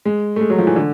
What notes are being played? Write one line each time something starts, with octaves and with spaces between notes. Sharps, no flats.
G#3
A3
G#3
F#3
F3
E3
D3